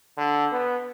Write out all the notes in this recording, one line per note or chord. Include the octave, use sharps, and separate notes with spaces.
D3
B3